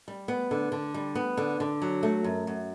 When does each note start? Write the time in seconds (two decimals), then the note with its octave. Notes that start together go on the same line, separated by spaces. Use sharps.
0.08 G3
0.28 B3
0.51 D3
0.72 D3
0.94 G3
1.15 B3
1.37 D3
1.60 D3
1.82 F#3
2.03 A3
2.24 F#2
2.47 F#2